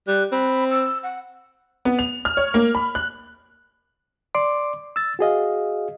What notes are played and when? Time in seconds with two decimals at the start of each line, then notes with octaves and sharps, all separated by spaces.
0.08 G3 F#6
0.32 C4 B5
0.70 E6
1.03 F#5
1.85 B3
1.99 F7
2.25 F6
2.37 C#5
2.54 A#3
2.75 B5
2.95 F#6
4.35 D5 C6 D6
4.96 E6 A6
5.19 F#4 G#4 D#5 F5